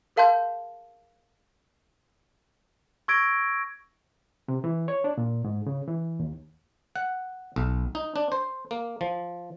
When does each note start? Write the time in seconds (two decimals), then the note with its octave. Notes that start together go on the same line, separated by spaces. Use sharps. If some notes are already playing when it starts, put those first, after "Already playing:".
0.16 G#4 A#4 F5 A5 C6 G6
3.08 C#6 E6 G#6 A#6 D7
4.48 C3
4.64 E3
4.88 C#5
5.04 D4
5.18 A#2
5.45 G#2
5.67 C#3
5.88 E3
6.19 D#2
6.96 F#5
7.56 B1
7.95 D#4
8.16 D4
8.32 C5
8.71 A#3
9.01 F3